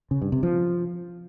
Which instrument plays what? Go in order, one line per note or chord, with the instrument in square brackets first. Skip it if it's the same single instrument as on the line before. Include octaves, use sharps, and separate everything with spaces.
[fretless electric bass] C#3
G2
C3
F3